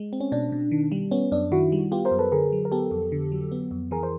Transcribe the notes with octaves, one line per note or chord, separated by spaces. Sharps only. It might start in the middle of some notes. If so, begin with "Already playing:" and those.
Already playing: G#3
C4
C#4
B2 D4
B2
D#3
G3
B3 C#4
F#2 D4
D#3 E4 F#4
G3
B3 F4 G4
A#4 C5
F#2
A4 B4
D3 G#4 A#4
F#3
A#4
B3 G4 A4
F2
D3
F#3
B3
F2
E3 G#4 A#4
C5